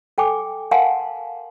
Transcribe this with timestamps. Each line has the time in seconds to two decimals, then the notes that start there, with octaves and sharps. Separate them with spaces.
0.18 A4 G5 G#5 D6
0.71 A#4 F5 F#5 G#5 A5 C6